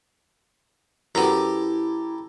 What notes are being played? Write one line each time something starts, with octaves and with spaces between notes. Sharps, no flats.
F#2 B3 E4 G4 A4 A#5